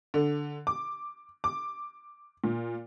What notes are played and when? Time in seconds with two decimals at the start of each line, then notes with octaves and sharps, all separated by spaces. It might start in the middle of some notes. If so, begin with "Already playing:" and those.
0.14 D3
0.67 D6
1.44 D6
2.44 A#2